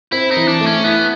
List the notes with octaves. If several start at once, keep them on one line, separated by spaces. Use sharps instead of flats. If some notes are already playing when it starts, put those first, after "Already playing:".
C4 E4
D#4
E3
D4
A3
C#4
B3 E4